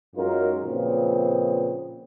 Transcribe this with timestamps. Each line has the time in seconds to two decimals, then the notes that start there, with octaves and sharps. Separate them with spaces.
0.16 F#2 G#3 D#4 F4 A#4
0.64 A#2 C#3 F3 B3 C4